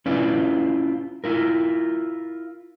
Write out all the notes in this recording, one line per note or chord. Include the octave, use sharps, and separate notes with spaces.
C#4 E4 F4 B4 D5
E4 F4 A#4